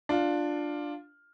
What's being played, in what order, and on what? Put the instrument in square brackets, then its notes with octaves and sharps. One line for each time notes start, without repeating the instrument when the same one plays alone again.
[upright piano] D4 F4